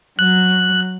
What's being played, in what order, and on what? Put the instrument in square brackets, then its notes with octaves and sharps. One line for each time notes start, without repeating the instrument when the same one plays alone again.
[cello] F#3 [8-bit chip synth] F#6